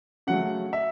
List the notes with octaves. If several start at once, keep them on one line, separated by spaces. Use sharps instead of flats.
C#3 F#3 A3 F#5
E5